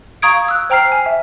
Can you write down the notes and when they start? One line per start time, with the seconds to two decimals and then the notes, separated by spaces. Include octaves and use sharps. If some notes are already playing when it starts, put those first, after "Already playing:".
0.22 F5 A#5 C#6 D#6 G#6 D7
0.48 E6 F#6
0.70 C5 G5 A#5 F6 C7
0.92 G#5
1.06 E5